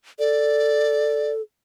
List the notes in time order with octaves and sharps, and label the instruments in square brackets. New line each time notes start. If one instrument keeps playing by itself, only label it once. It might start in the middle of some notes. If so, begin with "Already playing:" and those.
[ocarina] A4 [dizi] D5